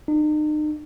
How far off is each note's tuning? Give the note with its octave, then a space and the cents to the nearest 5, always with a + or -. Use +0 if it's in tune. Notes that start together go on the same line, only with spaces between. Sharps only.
D#4 -40